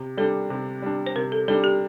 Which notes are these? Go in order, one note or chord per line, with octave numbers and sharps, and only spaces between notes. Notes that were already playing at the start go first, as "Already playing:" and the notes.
Already playing: C3
G3 D4 A4
C3
G3 D4
C5
C3 A#4
A4
G3 D4 A4
G4